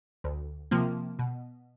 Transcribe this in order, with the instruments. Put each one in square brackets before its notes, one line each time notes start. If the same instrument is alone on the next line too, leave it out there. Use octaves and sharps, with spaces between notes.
[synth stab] D2
C3 F3 A#3
B2